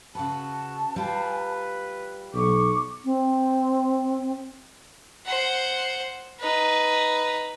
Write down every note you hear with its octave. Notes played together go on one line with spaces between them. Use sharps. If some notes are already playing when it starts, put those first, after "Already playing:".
C#3 F#4 B4 A5
G3 F4 B4
B1 C#6 D6
C4
C5 F#5
D#4 B4